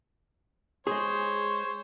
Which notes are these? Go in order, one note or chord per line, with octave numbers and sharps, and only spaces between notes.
G#3 G#4 C5 C#5